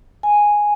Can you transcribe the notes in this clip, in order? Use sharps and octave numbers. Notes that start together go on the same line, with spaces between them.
G#5